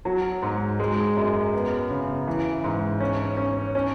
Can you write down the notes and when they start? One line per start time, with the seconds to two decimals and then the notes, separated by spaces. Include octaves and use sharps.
0.05 F#3
0.42 G#2
0.79 G#3
1.17 F#2
1.54 B3
1.91 C#3
2.27 E3
2.64 G#2
3.00 C#4
3.37 C#4
3.75 C#4